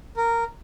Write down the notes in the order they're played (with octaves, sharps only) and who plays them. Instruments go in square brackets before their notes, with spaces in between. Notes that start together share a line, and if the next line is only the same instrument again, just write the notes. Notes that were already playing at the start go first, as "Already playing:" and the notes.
[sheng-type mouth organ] A#4